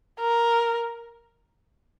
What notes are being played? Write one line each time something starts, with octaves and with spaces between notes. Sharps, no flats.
A#4